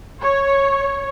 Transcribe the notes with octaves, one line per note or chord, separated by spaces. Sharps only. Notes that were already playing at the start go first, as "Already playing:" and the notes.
C#5